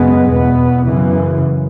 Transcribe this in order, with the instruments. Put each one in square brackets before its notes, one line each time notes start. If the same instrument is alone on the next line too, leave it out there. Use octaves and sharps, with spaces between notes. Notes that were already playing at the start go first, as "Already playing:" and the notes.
Already playing: [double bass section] F#2 C#3 G#3 B3
E2 B2 B3
F#2 C#3 E3